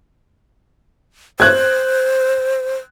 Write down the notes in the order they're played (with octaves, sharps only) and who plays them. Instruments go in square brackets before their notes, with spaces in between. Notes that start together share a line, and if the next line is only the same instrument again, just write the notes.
[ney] C5 [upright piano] F#6 G#6